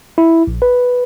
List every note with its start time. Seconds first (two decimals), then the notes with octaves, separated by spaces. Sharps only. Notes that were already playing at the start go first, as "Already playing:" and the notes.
0.18 E4
0.47 A#1
0.62 B4